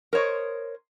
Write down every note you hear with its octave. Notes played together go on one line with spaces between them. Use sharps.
A#4 C5 C#5 D#5